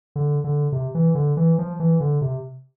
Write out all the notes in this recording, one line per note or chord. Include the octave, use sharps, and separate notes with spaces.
D3
D3
C3
E3
D3
E3
F3
E3
D3
C3